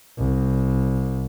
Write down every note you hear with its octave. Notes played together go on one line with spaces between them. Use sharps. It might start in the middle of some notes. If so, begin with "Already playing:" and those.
C2